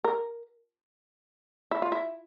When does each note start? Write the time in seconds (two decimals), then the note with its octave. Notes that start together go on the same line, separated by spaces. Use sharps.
0.04 A#4
1.71 E4
1.82 F4
1.92 E4